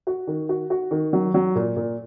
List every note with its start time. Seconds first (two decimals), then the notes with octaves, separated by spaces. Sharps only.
0.07 F#4
0.27 D#3
0.49 F#4
0.70 F#4
0.91 D#3
1.13 F#3
1.34 F#3
1.55 A#2
1.77 A#2